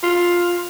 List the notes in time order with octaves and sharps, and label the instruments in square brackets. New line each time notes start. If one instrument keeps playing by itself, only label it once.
[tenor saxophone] F4